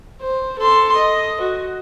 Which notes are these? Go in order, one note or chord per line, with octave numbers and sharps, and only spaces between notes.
C5
A4 C6
D#5
F#4